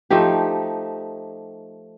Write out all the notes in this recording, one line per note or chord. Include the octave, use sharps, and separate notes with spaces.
F3 A3 D#4 G4